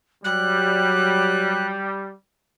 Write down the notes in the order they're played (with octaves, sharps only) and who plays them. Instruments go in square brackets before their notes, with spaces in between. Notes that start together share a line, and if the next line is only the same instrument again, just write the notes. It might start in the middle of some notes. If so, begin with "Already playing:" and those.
[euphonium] F#3 [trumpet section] G3 [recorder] F#6